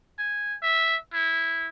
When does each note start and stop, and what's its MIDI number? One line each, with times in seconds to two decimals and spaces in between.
0.18 0.55 80
0.62 0.96 76
1.13 1.68 64